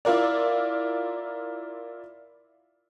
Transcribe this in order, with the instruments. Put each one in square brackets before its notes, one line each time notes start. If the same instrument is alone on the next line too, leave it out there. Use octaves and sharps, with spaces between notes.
[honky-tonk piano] E4 F4 A#4 D5